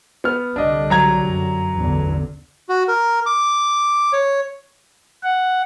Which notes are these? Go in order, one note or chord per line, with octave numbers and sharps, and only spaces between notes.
B3 F6
C2 D3 G3 D4 D#5
F#3 A#5 G#6
F#2
A1 E2 D3
F#4
A#4
D6
C#5
F#5